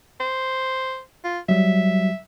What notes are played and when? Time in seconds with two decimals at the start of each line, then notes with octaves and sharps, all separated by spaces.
0.20 C5
1.24 F4
1.49 F#3 G3 E5